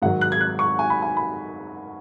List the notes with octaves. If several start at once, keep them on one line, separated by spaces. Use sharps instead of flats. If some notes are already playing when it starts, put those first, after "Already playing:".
G#2 D#3 F#3 F#5
F#6
G#6
F#6
C#6
G#5
B5
G#5
B5